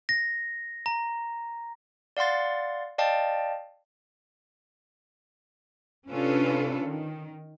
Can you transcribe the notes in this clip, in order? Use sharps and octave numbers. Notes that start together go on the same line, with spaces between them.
A#6
A#5
D5 F5 F#5 C6 A6
D5 D#5 F5 G5 A5
C3 C#4 D4 F4 A4 B4
D#3